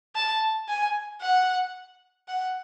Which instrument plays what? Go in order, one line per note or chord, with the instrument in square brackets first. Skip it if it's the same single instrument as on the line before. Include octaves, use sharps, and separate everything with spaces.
[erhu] A5
G#5
F#5
F#5